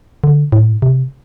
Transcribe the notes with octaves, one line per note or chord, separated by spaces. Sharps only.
D3
A2
C3